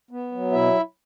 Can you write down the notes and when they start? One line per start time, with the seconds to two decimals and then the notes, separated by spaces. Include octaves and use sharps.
0.11 B3
0.32 F#3
0.52 B2 E4 E5